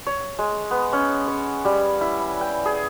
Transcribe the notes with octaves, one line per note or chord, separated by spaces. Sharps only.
C#5
G#3
B3
C#4
C#5
G3
E4
G5
G#4